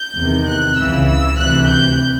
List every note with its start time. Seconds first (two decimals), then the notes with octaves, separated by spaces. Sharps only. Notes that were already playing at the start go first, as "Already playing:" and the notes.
Already playing: G6
0.15 E2 C3 D#3
0.46 F#6
0.76 C#2 C#3 E3 E6
1.07 E6
1.38 D2 C3 E3 F#6
1.69 G6